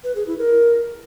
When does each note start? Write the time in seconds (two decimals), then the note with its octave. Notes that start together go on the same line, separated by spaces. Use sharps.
0.04 B4
0.15 G#4
0.27 E4
0.38 A#4